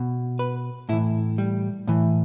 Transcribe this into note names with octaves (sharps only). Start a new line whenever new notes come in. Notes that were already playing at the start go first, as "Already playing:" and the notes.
Already playing: B2
B4
A2 E3 E4
G3
A2 E3